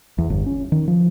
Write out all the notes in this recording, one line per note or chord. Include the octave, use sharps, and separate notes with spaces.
E2
G1
C#4
D#3
F3